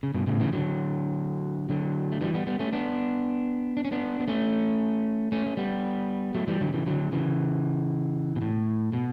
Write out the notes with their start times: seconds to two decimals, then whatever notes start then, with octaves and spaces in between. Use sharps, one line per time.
0.03 C#3
0.14 G2 B2
0.27 A2 C#3
0.40 C#3 E3
0.53 D3 F#3
1.70 D3 F#3
2.12 A3
2.21 E3 G3
2.34 G3 B3
2.47 G3 B3
2.59 A3 C#4
2.73 B3 D4
3.77 D4
3.85 C#4
3.92 B3 D4
4.20 B3
4.28 A3 C#4
5.32 A3 C#4
5.46 A3
5.57 G3 B3
6.35 F#3 A3
6.48 E3 G3
6.61 D3 F#3
6.74 C#3 E3
6.86 D3 F#3
7.12 C#3 E3
8.36 B2
8.42 A2
8.93 B2